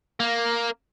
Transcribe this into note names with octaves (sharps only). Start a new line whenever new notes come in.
A#3